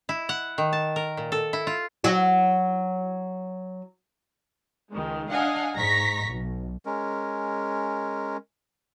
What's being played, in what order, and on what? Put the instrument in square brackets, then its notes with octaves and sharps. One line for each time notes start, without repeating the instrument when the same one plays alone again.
[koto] E4
F#5
D#3
A5
A#4
A#2
A4
E4
F4
[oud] F#3 F#4
[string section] C#2 D#3 G#3
D4 D#5 F5 F#5 G#5
G#2 A#5 C#6 A#6 B6
B1
[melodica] G#3 C#4 A#4